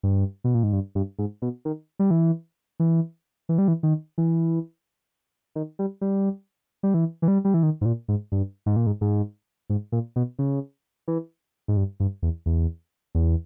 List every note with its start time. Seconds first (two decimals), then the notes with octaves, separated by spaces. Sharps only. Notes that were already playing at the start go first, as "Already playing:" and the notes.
0.03 G2
0.44 B2
0.54 A#2
0.63 G#2
0.73 G2
0.95 G2
1.19 G#2
1.42 B2
1.65 D#3
1.99 G3
2.11 E3
2.80 E3
3.49 E3
3.58 G3
3.68 E3
3.83 D#3
4.18 E3
5.55 D#3
5.79 G3
6.01 G3
6.83 G3
6.94 E3
7.22 E3
7.28 G3
7.45 G3
7.54 E3
7.63 D#3
7.81 G#2
7.85 A#2
8.08 G#2
8.32 G2
8.66 G#2
8.76 A#2
8.87 G#2
9.01 G#2
9.70 G#2
9.92 A#2
10.16 B2
10.39 C#3
11.08 E3
11.68 G#2
11.77 G2
12.00 G2
12.23 E2
12.46 E2
13.15 E2